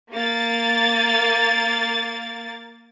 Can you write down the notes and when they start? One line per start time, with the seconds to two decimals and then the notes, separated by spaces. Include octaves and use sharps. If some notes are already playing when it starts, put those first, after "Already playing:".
0.12 A#3 A6